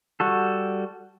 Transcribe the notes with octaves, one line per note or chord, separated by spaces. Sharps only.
G3 F#4 A4